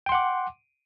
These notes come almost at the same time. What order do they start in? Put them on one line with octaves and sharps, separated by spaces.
G5 C6 F#5 D6